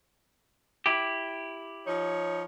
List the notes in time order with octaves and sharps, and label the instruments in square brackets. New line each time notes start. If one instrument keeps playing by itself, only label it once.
[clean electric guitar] E4 G4
[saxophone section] F3 D#4 C#5